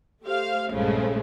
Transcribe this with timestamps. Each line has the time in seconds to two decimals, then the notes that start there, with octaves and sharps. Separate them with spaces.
0.23 A3 G4 C5 F5
0.71 A#1 G2 C#3 F3 G#3 A3